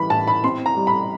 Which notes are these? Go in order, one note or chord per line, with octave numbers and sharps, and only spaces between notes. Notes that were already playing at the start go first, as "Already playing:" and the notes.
Already playing: E3 G3 B5
A2 A5
B5
C4 C6
A#5
G3
B5